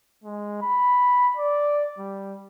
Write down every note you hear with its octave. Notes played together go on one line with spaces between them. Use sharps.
G#3
B5
D5
G3